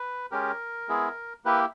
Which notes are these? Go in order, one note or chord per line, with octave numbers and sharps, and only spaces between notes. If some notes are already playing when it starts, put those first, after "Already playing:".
Already playing: B4
G#3 C#4 G4 A#4
G#3 B3 E4 G#4
A#3 E4 G4 B4